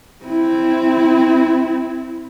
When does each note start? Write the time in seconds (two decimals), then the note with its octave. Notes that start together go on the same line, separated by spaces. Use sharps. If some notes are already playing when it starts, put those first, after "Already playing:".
0.24 C4 E4